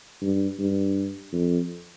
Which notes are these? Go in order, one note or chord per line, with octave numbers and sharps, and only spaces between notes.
G2
G2
F2